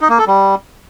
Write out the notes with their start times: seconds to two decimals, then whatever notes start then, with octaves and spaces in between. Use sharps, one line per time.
0.01 D#4
0.10 A#3
0.18 A4
0.27 G3